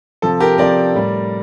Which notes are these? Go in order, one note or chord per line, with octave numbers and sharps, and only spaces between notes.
C3 F3 A4
G4 A#4
C3 F3 A#4 D5
A2 G3